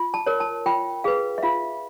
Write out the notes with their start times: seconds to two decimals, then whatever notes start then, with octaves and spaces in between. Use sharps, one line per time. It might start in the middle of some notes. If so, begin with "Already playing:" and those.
Already playing: F4
0.14 A5
0.26 A#4 C#5
0.40 A5
0.66 F4 G5
1.04 G#4 B4 F5
1.38 E5
1.43 F4 F5